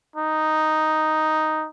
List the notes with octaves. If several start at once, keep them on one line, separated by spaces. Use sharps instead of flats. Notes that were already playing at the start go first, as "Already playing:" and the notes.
D#4